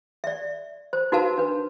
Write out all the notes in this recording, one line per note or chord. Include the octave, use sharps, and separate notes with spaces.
D5 E5
C5
D#4 F#4 A#4 B4 F5 A5
D4 B4